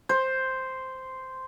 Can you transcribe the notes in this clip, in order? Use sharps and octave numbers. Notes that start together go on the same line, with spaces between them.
C5